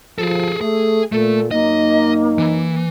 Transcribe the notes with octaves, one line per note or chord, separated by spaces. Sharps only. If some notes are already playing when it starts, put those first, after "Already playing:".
F3 G#4 A4
A3 G#4 A4
A#2 A3 A4
F#2 A#3 D#4 D#5
E3